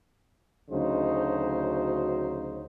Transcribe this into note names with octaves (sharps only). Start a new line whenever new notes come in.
D2 C#3 F#3 D#4 C5